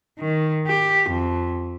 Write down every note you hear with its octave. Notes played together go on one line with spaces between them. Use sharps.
D#3
G4
F2